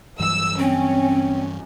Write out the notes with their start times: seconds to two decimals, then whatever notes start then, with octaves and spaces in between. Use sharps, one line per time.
0.20 G2 E3 F#3 E6
0.59 C4 C#4